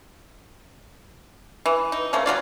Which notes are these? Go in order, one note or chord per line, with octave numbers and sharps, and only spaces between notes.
E3
D#4
C#3 F3 A3 A#3
F#3 B3 F4 D5